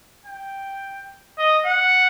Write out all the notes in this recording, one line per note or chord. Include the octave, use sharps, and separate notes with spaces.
G5
D#5
F#5